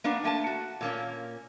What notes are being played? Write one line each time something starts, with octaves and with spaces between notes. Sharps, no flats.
A#3 B3 D4
A3 A#3 G#5 A5
F#4
A#2 A#3 C#4